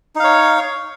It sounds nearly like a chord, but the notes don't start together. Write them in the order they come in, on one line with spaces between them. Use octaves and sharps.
D#4 F5 C#5